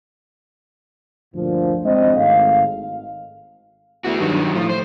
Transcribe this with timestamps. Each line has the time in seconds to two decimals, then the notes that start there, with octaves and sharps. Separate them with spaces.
1.34 D2 G2 A#2 D3 F3
1.85 G#3 C4 D4 D#5
2.16 G#1 A3 F5
4.04 E2 A3 F#4
4.20 G2 D#3 F#3
4.55 A2 F3
4.69 C5